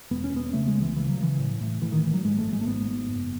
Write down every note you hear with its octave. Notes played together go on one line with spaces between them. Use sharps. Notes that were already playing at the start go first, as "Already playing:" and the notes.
E1 B3
C#4
E1 B3
C#3 A3
G#3
C#2
E3
C#3 E3
F#3
C#3 E3
A2
A2
A2 E3
D#3
A1 E3
F#3
G#2 G#3
A3
G#1
G#3
A3
G#2 B3
G#1
F#1